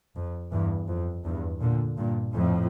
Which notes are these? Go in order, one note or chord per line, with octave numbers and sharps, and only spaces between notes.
F2
E2 G2
F2
E2 G2
A#2 D3
G2 A#2
F2 A2